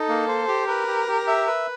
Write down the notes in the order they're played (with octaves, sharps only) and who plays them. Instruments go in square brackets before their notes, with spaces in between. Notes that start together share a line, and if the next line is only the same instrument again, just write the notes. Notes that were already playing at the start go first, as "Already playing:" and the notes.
Already playing: [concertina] D#4 [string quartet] A4
[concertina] A#3
C5
G4
[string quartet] A#4 [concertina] B4
[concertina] G4
G4
E5
B4